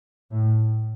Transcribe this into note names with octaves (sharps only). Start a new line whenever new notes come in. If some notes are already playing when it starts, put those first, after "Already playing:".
A2